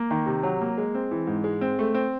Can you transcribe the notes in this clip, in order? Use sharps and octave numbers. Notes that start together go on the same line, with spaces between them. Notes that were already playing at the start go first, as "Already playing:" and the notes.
Already playing: A#3
D#3
C3
F#3
A#3
G#3
C4
E3
G#2
G#3
C4
A3
C4